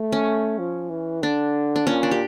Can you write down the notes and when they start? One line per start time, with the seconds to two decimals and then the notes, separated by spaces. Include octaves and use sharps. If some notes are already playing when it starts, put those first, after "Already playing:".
Already playing: A3
0.12 C#4
0.59 F3
0.90 E3
1.22 D3 D4
1.76 D4
1.87 A#2 C#4
2.03 D4
2.11 G4